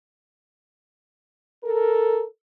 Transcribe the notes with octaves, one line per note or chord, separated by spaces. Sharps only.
A4 A#4